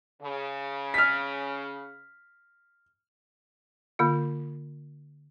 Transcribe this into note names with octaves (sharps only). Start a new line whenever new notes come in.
C#3
F6 B6
D3 A#3 F4